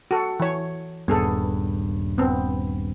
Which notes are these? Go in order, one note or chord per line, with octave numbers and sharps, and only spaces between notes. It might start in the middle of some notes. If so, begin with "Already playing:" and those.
F#4 A4
E3 C#5
D#1 G2 B3 G#4 A4
B3 C4